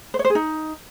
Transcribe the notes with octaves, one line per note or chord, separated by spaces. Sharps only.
C5
C#5
C5
G#4
D#4